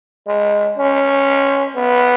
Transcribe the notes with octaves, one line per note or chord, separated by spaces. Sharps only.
G#3
C#4
B3